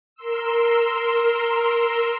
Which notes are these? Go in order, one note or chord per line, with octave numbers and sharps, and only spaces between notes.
A#4 C6 E6